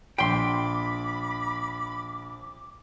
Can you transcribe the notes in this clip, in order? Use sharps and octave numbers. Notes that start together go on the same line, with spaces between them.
A#1 G5 B5 C6 D6 D7